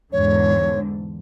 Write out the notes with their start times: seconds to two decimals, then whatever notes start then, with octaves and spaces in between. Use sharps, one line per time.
0.12 E2 G#2 D3 C#5